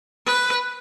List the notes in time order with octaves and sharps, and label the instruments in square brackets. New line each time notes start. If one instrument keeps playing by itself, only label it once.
[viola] B4